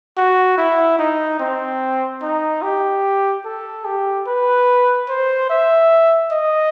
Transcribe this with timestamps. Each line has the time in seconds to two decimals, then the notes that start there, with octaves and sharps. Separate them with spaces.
0.17 F#4
0.58 E4
0.99 D#4
1.40 C4
2.22 D#4
2.62 G4
3.45 A4
3.85 G4
4.27 B4
5.09 C5
5.50 E5
6.31 D#5